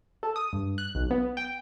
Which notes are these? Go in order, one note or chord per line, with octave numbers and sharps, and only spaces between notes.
A4
D#6
G2
F#6
B1
B3
G5